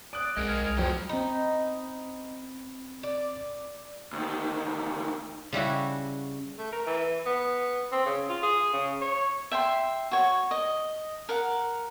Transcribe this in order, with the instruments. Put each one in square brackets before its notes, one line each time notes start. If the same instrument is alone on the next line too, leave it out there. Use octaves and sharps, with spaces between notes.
[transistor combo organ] D5 [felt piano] D#6 F#6
[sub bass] B1 [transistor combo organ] G#3 F6 [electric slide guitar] G#4 A#4 D#5
[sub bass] C2
[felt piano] F2 F#3 [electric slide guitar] A2 F4 G5
[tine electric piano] C4 B5 [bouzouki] D#4
[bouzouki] D5
[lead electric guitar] D2 D#3
[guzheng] C#3 G3 E4 F#4
[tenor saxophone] A3
A#4
E3
B3
C4
C#3
F4
G#4
C#3
C#5
[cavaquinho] E5 G5 C6
F#4 C#5
D#5
A#4 F5 F#5